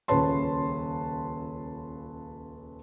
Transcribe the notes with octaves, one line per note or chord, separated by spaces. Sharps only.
D#1 C#2 B4 C#5 A5 C6